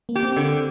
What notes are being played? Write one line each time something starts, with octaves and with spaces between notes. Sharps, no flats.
A#3
G4
C4
D3